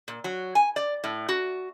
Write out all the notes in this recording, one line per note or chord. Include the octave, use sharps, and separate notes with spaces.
A#2
F#3
G#5
D5
A2
F#4